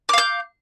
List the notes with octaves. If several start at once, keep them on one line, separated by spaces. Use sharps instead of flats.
F5 D6 G6